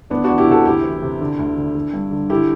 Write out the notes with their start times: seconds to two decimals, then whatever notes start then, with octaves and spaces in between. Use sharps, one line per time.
0.10 D2 B3 D4
0.24 E3 D4 F#4
0.38 E4 G4
0.47 C3 F#4 A4
0.65 D2 E4 G4
0.84 E3
1.02 C3
1.20 D3
1.39 D2
1.56 D3
1.75 D3
1.94 G2
2.11 D3
2.29 D3 E4 G4